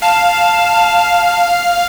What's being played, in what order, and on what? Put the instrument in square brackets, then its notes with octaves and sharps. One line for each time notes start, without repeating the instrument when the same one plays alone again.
[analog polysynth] F5 [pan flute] A5